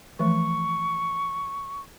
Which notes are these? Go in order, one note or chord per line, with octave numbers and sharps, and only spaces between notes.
E3 F3 A3 C#6